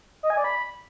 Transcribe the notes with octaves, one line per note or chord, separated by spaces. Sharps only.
D#5
G#5
D5
B5